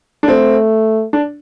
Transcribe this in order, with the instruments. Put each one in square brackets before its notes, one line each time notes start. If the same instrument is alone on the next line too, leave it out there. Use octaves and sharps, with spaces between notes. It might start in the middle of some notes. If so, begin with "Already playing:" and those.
[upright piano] D4
[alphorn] A3 [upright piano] C4
[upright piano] D4